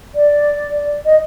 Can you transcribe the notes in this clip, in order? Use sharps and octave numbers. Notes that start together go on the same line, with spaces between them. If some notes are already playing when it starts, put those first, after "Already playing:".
D5
D#5